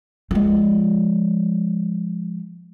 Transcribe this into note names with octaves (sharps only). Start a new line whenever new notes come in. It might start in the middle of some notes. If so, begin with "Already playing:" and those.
F3 G#3